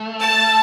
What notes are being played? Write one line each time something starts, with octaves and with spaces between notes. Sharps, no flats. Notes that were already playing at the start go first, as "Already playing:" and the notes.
Already playing: A3
A5